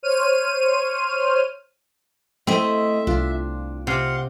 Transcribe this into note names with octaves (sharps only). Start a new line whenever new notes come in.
C5 C#5 F6 D#7
A3 C4 E4 D#5 E5
C2 D4 F4
C3 F5 F#5 C6